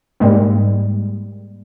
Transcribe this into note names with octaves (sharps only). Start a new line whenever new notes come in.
G#2 G3 G#3 A#3